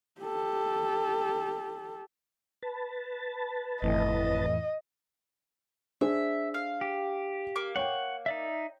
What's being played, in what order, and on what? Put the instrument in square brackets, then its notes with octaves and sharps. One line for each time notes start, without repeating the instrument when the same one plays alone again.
[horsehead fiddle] G4 A4
[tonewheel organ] B4 A5
[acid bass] G1 [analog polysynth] F2 A2 E3 [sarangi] D#5
[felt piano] D4 G#4 C5 [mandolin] E5
[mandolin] F5
[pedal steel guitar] G4
[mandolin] A#3 D6
[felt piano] C#5 G5 [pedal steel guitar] F#5 C#6
[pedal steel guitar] D#4 D5 E5